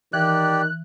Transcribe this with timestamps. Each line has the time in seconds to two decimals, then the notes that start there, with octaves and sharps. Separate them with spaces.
0.13 D#3 E3 G4 D5 F#6